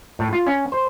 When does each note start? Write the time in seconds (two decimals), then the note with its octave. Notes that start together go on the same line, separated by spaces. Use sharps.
0.19 A2
0.33 F4
0.47 C#4
0.72 C5